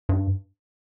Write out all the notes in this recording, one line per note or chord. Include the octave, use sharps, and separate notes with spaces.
G2